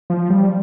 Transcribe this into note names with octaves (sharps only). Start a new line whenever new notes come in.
F3
G3